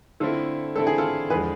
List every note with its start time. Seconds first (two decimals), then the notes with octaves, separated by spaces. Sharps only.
0.20 D3 A3 C4 E4 F4 A4
0.75 D3 A3 C4 E4 A4
0.87 G#4
0.98 F4 A4
1.30 E2 D3 F3 G#3 G#4 B4